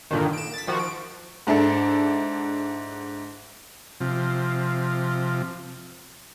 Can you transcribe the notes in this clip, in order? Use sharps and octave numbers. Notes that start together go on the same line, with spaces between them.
G2 A#2 D3 D#3
D7 E7
A6 B6
D#3 F3 F#4
D7
G#2 D4 E4 A4
C3 F3